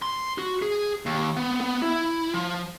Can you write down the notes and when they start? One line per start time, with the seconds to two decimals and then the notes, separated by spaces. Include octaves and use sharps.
0.02 C6
0.38 F#4
0.62 G#4
1.06 D#2
1.37 B3
1.61 B3
1.82 E4
2.34 F3